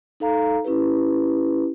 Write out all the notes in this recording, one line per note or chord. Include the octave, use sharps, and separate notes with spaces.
D#4 A4 F5 A#5
C#4 E4 G4 B4